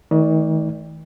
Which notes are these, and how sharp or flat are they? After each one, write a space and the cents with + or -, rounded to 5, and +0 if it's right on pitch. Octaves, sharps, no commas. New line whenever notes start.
D#3 +40 A3 -20 D5 +0